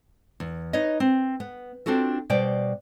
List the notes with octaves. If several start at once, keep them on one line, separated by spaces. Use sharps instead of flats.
E2
D#4 B4 C#5 D#5
C4
B3
C4 D4 F4 F#4 A4
B2 G3 C5 D5 G5